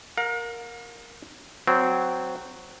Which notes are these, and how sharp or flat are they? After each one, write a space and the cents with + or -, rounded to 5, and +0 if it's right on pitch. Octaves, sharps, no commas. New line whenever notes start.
A#4 +0 F5 +45
F#3 +0 C4 -15